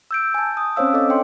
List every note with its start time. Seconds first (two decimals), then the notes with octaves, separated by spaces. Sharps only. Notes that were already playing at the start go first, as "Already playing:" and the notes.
0.11 E6 G6 D7
0.34 G#5 A5
0.57 D#6
0.76 C4 C#4 C5 C#5 F5 E6
0.94 A4 D#5 D6
1.09 D4 G5 C6